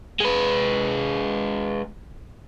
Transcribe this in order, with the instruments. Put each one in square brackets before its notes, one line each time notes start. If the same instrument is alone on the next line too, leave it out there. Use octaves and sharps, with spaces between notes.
[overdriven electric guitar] G#3 B4